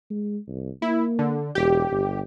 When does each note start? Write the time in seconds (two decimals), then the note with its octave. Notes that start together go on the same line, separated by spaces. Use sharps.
0.11 G#3
0.48 C2
0.82 A#3 E4
1.19 D3
1.55 E1 G4
1.91 G1